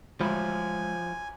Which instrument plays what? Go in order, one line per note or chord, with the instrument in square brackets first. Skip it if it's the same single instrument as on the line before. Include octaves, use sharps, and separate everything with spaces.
[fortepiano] A1 D2 B5 [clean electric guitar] F3 [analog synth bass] G#3 [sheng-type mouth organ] G#5